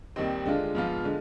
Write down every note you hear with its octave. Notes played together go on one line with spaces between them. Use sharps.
D#2 D#3 G3 C4 D#4
D3 G#3 D4 F4
G#2 F3 B3 F4
D3 G#3